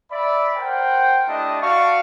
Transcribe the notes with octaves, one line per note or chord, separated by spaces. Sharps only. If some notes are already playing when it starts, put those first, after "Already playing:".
D5 E5 B5
A#4 C5 F#5 G5
A3 D4 E4 G4 D#5 A5
F#4 D5 F5 A5 C#6